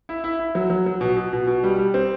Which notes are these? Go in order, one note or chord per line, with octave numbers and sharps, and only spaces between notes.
E4
E4
E4
F#3
F#3
F#3
B2
B2
B2
B2
G3
G3
C4